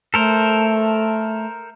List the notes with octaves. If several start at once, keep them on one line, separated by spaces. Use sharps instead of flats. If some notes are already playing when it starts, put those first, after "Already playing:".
A3 A4 A#4 C5